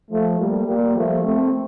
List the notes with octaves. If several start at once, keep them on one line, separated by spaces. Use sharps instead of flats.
F3 A3
G3 A#3
G3 A#3
F3 A3
A3 C4